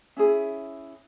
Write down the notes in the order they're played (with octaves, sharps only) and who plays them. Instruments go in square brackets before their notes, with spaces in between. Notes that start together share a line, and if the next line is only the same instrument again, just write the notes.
[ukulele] C#4 E4 G#4